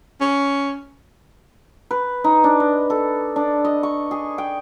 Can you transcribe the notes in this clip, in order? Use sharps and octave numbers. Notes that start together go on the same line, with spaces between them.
C#4
B4
D#4
D4
D#5
A4
D4
D#5
C#6
G#4
G5